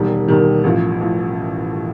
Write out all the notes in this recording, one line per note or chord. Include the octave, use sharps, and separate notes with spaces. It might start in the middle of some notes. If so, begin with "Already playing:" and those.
Already playing: E1 D#2 D#3 G3
E1 D#2 D#3 G3
A1 A2 F3
A2 F3